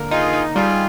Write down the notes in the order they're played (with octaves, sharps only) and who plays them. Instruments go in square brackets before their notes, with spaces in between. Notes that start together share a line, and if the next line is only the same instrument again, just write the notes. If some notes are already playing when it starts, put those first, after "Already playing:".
Already playing: [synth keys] D3 A#3 A#4
[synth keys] D#4 [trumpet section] F4 G#4
[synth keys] D#4
[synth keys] G3 [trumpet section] F4 G#4